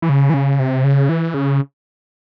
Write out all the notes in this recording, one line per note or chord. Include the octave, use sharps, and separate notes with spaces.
E3
C#3
E3
C#3
C3
C#3
E3
C#3